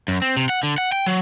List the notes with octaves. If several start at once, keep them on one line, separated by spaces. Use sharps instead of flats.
F#2
C4
C3
F#5
D3
F#5
G5
F#3